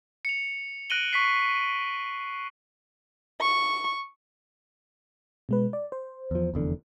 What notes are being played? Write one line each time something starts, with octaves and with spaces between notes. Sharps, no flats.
C#7 F7
F#6 A#6 D7 D#7 F#7 G7
C#6 B6 C7
C#6
B2 G#3 B4
D5
C5
E2 F3
F1 E2 D3